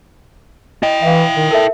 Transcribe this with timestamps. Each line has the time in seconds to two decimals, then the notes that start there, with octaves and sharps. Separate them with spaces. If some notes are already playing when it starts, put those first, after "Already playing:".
0.83 E4 D#5 G5
1.03 E3 E5 F5
1.36 D#3
1.51 A4 A#4 E5